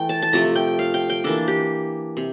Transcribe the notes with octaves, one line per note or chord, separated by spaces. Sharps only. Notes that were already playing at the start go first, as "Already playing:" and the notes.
Already playing: E3 A3 G5
A5
A5
C3 F3 A3 A#5
G5
F5
G5
G5
E3 A#3 D4 A4
G4
C3